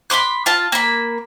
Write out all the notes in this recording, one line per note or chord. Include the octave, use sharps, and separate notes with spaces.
B5 C6 D6 F#6
F4 A5
A#3 B5